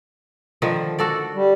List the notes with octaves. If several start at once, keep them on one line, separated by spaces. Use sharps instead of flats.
D3 D#3 F3
F#4 A4 D5
G3